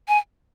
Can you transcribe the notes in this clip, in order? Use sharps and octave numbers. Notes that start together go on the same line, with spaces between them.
G#5